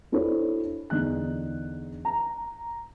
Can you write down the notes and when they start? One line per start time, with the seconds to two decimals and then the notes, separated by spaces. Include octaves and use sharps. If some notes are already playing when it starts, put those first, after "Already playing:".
0.12 D4 E4 F#4 A4 C5 C#5
0.90 E2 D3 D#4 F#6
2.05 A#5